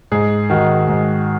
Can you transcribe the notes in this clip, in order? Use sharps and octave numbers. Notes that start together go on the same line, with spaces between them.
G#2 G#4
D#3 F#4
G#2